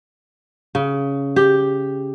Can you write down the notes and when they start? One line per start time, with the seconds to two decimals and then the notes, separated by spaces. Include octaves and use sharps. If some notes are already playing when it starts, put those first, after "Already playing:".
0.75 C#3
1.36 G4